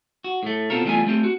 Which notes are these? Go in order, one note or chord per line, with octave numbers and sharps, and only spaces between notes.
F#4
A2 A3
B2 C4 F4 A4 A#4
E2 G3 A3 D4 F4 G#5
A3 C4 G4
F#4